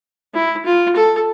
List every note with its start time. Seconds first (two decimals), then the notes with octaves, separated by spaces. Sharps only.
0.34 E4
0.65 F4
0.96 A4